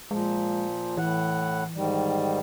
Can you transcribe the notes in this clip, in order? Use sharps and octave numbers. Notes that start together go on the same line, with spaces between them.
A#2 F3 G#3
A2 E3 F#5
G#2 D#3 G3